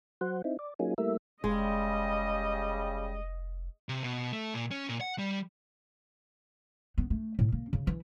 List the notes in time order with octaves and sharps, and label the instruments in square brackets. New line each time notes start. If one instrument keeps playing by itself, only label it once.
[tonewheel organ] F#3 C5 F#5
C4 D#4 E4
D5
F#3 A#3 C#4 D#4 F4 G#4
G3 A3 A#3 E4 A#4 E5
[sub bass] F1 [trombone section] C#3 G3 [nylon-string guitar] G#3 [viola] D#5
[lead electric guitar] C3
B2
A3
A#2
C#4
A#2
F#5
G3
[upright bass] B3
A3
A2
A#3
C#3
E3